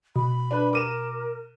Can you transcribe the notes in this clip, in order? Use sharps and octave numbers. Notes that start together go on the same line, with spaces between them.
B2 B5
D4 B4
A#4 D6 D#7 E7